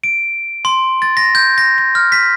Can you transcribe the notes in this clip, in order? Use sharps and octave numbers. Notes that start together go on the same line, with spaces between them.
D7
C6
A6
A#6
G6
A#6
A#6
F6
B6